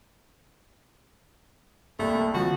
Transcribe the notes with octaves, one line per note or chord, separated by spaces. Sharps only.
C2 A3 A#3
D3 D#3 F3 G3 F#4